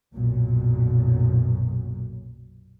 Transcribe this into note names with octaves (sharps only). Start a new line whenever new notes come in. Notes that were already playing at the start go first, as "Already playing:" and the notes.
B1 F#2 A#2